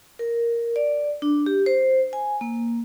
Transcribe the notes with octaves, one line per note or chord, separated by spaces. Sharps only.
A#4
D5
D4
G4
C5
G#5
A#3